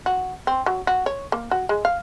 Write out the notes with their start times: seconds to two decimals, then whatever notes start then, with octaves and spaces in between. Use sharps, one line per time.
0.06 F#4
0.47 C4
0.66 F#3
0.87 F#4
1.06 C#5
1.32 A#3
1.51 F#4
1.69 G#3
1.85 F5